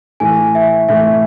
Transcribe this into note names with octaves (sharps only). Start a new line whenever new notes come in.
A2 E3 A3 G#5
E5
A2 E3 A3 E5